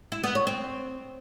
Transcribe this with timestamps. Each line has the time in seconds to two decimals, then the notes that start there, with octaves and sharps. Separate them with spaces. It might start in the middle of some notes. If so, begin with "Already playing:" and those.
0.12 E4
0.23 B3
0.35 C#5
0.47 C4